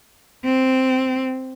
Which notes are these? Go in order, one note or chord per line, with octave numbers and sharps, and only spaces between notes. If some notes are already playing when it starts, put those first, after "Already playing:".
C4